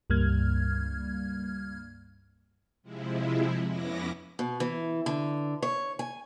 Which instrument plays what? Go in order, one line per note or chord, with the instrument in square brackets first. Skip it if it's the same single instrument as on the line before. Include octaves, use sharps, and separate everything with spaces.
[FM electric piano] C#2 G2 G3 A#3 F6 G#6
[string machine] C3 F3 G#3 E4
F2 B3 C#4 E4 D6 A#6
[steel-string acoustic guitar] B2
E3
D3
C#5
G#5